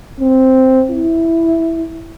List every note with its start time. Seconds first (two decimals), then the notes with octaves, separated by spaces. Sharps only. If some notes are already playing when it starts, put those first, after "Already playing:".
0.20 C4
0.91 E4